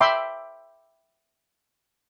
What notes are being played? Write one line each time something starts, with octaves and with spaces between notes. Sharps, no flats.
E5 G5 B5 C6 D6